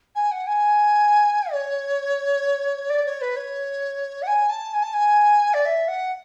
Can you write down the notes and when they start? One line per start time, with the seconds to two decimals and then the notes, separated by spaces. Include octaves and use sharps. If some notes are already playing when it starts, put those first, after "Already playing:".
0.15 G#5
0.31 F#5
0.46 G#5
1.52 C#5
2.89 D5
3.05 C#5
3.21 B4
3.36 C#5
4.22 F#5
4.27 G#5
4.49 A5
4.73 G#5
4.82 A5
4.93 G#5
5.53 D5
5.65 E5
5.87 F#5